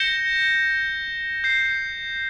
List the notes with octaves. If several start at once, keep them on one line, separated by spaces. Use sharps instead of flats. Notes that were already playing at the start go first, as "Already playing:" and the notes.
Already playing: G6 A#6 C#7 E7 G7
G6 C7